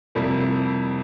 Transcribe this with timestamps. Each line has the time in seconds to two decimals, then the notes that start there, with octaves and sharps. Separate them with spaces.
0.15 F2 C3 G3 A#3 E4